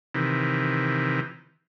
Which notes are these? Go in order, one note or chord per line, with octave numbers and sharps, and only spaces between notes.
C3 D#3 E3